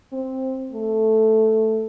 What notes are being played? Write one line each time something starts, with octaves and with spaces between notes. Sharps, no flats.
C4
A3